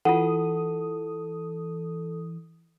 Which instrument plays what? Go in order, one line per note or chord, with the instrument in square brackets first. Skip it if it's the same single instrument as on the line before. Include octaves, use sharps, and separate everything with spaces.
[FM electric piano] E3 D#6 [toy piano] F4 F#5 [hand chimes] A4